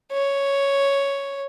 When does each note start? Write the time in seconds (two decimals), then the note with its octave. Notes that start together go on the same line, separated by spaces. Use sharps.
0.12 C#5